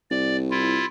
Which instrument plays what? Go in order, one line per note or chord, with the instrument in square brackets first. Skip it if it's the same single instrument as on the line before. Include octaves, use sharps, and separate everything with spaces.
[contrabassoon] C2 [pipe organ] D5
[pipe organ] E4 F4